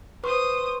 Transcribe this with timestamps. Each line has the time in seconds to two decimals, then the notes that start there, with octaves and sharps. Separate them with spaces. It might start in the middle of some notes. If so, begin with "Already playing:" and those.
0.24 B4 C5 C6 C#6 D#6